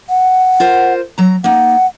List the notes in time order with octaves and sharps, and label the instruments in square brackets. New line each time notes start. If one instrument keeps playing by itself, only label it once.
[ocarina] F#5
[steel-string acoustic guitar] F4 A#4 C5
F#3 A#5
[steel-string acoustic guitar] A#3 D#4 [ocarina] F#5